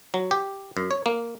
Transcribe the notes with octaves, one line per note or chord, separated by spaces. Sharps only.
F#3
G4
F#2
C#5
A#3